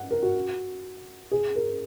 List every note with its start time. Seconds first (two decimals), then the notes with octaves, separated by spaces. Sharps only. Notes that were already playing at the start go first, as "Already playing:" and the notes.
Already playing: F#5
0.11 A#4
0.23 F#4
1.31 G#4
1.56 A#4